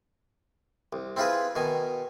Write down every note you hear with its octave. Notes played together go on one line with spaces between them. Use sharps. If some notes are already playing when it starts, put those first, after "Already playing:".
C2
C4 E4 F4 G#4 B4
B2 D#3 G#5